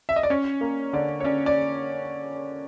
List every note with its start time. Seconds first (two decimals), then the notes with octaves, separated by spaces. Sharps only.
0.09 E5
0.16 D#5
0.23 D5
0.30 C#4 C#5
0.61 A#3
0.93 D3 D5
1.20 C#5
1.24 C#4 D5
1.46 D5